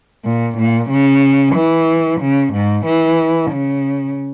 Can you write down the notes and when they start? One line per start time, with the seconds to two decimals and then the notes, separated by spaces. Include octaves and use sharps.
0.25 A#2
0.58 A#2
0.90 C#3
1.55 E3
2.20 C#3
2.53 G#2
2.86 E3
3.51 C#3